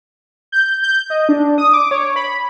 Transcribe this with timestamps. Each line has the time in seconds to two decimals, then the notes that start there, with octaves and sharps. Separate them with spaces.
0.52 G6
0.83 G6
1.10 D#5
1.29 D4
1.58 D#6
1.73 D6
1.91 C#5
2.16 B5